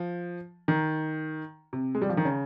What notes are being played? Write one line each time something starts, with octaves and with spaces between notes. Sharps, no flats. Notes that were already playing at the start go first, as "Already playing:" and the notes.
Already playing: F3
D#3
C3
G#3
G3
F3
D#3
C#3